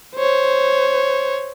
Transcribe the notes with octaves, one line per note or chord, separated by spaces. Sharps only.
C5 C#5